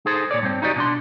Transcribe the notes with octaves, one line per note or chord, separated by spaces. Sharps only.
D#4 G#4 A4 C5
A#2 C#5 D5
G2 C4
D#4 E4 F#4 G4 D5 D#5
B2 D4 C6